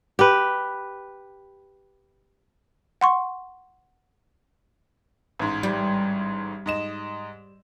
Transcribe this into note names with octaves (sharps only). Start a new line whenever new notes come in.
G4 B4
F#5 C6 C#6
A1 G#2
G3
G#2 D#5 E7